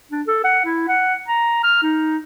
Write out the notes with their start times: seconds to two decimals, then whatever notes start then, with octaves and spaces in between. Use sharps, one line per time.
0.11 D4
0.27 A4
0.44 F#5
0.65 E4
0.88 F#5
1.28 A#5
1.64 F6
1.82 D#4